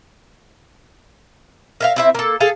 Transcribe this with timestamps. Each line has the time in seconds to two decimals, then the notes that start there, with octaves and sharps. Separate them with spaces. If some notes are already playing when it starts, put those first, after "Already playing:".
1.80 A#4 E5 F5
1.96 C4 E4 E5
2.15 A#3 A4
2.40 G#4 A4 F5